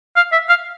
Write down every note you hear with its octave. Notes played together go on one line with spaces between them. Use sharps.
F5
E5
F5